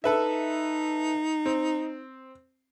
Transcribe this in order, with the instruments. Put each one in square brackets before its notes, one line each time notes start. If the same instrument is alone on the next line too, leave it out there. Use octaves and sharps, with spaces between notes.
[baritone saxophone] D#4 [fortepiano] A4 B4 E5
[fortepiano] C4